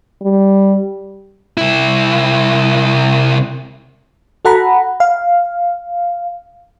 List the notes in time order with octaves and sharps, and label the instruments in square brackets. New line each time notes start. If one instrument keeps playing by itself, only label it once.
[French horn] G3
[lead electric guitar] C2 E4
[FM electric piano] F#4 A4 F#5 A#5 B5
F5